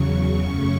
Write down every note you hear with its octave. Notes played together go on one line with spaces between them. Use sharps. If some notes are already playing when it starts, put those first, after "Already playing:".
Already playing: E2 C#3 F#3 C#6
F#2 C#3 A3 C#4 C#6